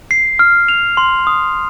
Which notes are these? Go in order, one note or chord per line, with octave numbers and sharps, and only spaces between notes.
C7
F6
F7
C6
D#6